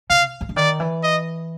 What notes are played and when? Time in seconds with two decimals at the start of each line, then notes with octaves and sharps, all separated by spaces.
0.10 C#3 F5
0.41 D#3
0.49 D3
0.56 D#3 D5
0.80 E3
1.03 D#5